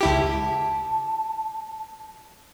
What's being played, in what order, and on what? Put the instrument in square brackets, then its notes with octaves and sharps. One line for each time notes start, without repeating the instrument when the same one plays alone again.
[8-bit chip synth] C#2 E4 G4 [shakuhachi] A5